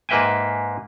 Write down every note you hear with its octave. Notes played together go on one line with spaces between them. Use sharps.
G#2 A#3 B4 E5 G5 G#5